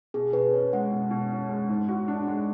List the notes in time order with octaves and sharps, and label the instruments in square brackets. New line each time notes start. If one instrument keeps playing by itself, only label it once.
[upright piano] B2 [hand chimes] G#4
[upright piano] B2 [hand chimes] B4
[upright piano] C#4 [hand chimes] C#5
[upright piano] G#3 [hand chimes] F#5
[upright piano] B2
B2
C#4
G#3
G#2
F#4
D4
G#3